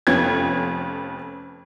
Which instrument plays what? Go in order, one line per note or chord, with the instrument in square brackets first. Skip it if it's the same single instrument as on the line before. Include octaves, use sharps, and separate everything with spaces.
[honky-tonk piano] F1 F2 B3 C#4 G#6